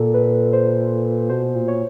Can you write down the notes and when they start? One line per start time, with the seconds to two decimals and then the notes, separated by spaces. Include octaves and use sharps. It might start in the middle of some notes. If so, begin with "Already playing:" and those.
Already playing: A#2 A4
0.14 B4
0.53 C5
1.30 B2 C5
1.55 A#2
1.68 C#5